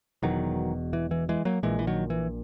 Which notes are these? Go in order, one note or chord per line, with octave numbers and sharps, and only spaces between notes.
E1 E2 B2 D#3 F#3
E3
E3
E3 G#3
F#3 A#3
A#1 A#2 E3 G#3
E3
D#3 F#3
E3